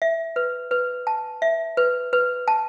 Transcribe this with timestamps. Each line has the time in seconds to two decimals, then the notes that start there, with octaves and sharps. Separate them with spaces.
0.02 E5
0.36 B4
0.71 B4
1.07 A5
1.42 E5
1.77 B4
2.13 B4
2.48 A5